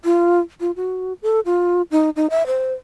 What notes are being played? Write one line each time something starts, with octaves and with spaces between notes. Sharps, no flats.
F4
F4
F#4
A4
F4
D#4
D#4
E5
C5